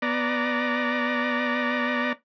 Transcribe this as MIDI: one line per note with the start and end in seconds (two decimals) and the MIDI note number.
0.02 2.13 59
0.02 2.13 74
0.02 2.13 82